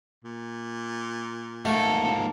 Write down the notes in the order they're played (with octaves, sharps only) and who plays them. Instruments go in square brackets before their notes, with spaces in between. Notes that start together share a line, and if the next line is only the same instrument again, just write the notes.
[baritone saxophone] A#2
[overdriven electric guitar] G#2 A#3 [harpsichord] A3 [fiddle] A4
[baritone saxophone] F3